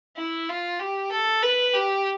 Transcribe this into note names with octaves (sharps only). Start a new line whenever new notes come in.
E4
F4
G4
A4
B4
G4